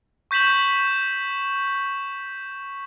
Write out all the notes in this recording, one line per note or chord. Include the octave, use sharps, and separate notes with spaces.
C#6 G6 B6 E7 F#7